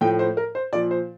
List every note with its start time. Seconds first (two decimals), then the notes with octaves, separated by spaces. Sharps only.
0.01 A2 F3 G5
0.19 C5
0.37 A#4
0.55 C5
0.72 A#2 F3 D5
0.91 C5